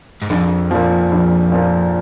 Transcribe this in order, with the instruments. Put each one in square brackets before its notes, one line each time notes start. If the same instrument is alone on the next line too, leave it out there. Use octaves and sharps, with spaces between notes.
[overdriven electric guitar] G#2
[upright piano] A#1 [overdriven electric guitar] F2
[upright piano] A#2 F3
A#1
A#2 F3